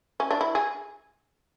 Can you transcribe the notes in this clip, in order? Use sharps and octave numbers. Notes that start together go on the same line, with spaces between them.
C#4
D4
E4
G#4